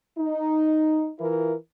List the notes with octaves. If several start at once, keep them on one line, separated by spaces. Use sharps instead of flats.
D#4
E3 E4 F4 A#4